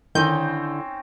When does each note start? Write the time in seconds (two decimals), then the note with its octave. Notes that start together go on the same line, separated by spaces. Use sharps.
0.15 D3 D#3 C4 C#4 D#4 E4 G#5 G6